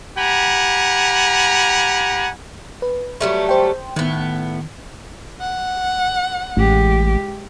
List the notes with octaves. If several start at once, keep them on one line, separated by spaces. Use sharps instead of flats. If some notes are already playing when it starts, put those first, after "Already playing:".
G4 F#5 G#5 A#5 B5
B4
F#3 G3 A3
C5 G5
A2 D#3 B3
F#5
A1 G#3 G4